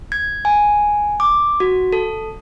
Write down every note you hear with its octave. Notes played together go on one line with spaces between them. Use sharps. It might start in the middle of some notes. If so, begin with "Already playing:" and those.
G#6
G#5
D6
F#4
A4